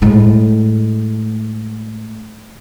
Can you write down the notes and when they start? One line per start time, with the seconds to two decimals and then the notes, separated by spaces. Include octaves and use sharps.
0.02 A2 G#3